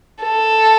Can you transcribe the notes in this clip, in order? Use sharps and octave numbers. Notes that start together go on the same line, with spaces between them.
A4